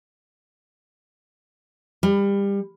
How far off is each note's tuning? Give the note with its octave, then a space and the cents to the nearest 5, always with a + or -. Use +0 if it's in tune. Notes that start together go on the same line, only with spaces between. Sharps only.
G3 +25